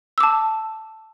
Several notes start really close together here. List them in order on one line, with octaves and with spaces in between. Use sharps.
E6 D6 A5